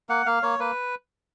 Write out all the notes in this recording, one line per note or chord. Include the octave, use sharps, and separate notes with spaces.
A#3 F#5
A#3 F5
A#3 C#5
A#3 B4